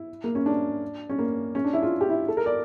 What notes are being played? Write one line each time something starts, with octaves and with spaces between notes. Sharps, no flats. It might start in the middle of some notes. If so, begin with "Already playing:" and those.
Already playing: E4
A#3
C#4
D4
C#4
A#3
C#4
D4
E4
F4
G4
E4
A4
A#4
D5